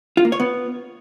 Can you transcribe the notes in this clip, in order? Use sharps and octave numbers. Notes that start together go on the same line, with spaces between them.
F4
A#3
C#5
B3